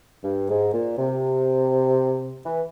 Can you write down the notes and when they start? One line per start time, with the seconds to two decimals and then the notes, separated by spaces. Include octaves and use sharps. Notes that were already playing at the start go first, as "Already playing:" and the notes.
0.24 G2
0.49 G#2
0.72 A#2
0.98 C3
2.45 E3